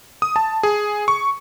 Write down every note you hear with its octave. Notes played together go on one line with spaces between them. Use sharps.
D#6
A5
G#4
C#6